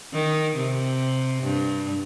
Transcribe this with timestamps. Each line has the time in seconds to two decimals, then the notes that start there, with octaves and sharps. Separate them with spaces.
0.13 D#3
0.57 C3
1.43 G2